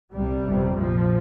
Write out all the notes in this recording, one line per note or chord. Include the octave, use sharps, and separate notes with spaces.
C2 C3 G3
G1 F2 C3
A#1 A#2 F3